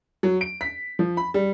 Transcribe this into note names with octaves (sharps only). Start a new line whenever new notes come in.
F#3
D7
B6
F3
B5
G3